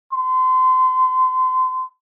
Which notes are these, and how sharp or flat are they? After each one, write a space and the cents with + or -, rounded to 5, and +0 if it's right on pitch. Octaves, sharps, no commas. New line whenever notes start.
C6 -30